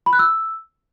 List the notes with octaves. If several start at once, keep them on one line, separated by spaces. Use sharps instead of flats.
B5
F#6
E6